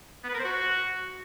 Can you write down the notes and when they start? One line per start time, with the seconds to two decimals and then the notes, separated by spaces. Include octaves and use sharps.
0.24 B3
0.29 B4
0.34 A#4
0.39 C5
0.45 F#4